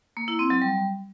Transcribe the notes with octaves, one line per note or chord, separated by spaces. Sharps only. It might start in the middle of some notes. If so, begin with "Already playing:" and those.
A#3
E4
C4
F#3
G3